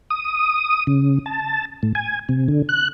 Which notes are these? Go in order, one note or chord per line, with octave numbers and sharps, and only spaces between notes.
D#6
C#3
A5
A2
G#5
C3
D3
F#6